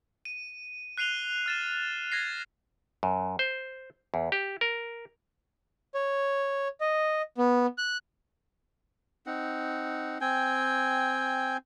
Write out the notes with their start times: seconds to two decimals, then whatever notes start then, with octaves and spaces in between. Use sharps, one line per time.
0.25 D#7
0.98 F#6 C7 D#7 F7 G7
1.46 F6 A6 E7
2.12 G#6 A#6 C7
3.03 F#2
3.39 C5
4.14 E2
4.32 G4
4.61 A#4
5.95 C#5
6.80 D#5
7.38 B3
7.78 F#6
9.26 C4 D#4 F#5
10.21 C4 G5 G#5